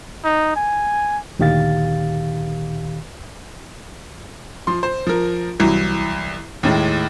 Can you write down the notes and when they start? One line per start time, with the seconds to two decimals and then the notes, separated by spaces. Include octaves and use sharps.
0.24 D#4
0.56 G#5
1.39 D2 A#2 D#3 G4 F5 A6
4.67 F3 C6
4.83 C5
5.07 F3 A#4
5.59 C2 E3 F#3
6.63 D#2 A2 G#3